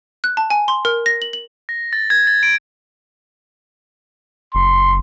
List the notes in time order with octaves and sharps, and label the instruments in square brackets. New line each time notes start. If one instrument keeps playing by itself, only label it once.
[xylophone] F#6
A5
G#5
C6
A#4
A#6
F#7
F#7
[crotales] A#6
A6
G#6
A6
D7
[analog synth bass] F#1 [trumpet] C6